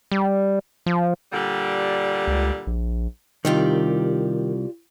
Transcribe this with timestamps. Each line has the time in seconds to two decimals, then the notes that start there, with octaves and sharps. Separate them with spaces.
0.12 G3
0.86 F3
1.32 A#2 D3 G3
2.27 C#2
2.67 A#1
3.45 C2 D#3 F4 G4 D5